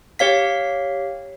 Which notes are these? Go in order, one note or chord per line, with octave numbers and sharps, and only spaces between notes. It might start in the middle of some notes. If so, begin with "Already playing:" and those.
G4 C#5 F5 B6